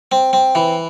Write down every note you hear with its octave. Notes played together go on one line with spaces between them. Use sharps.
C4
C4
E3